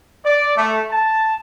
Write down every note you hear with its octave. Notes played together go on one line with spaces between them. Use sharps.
D5
A3
A5